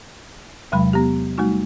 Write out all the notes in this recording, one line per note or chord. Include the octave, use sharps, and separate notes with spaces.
E2 C3 F#3 G#3 B5
B3 G4
G3 A3 D#4 F#4